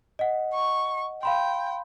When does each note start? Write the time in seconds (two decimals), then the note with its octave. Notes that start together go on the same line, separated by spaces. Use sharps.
0.19 D#5 F#5
0.54 C#6
1.23 F5 G5 B5 C6